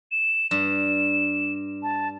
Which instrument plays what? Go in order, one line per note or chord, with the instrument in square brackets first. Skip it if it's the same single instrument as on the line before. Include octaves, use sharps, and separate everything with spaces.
[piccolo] E7
[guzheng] G2 [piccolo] E7
[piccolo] A5